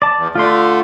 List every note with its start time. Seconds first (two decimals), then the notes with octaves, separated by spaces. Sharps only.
0.02 D5 A5
0.16 E2
0.35 D3 A3 F4 D5 C6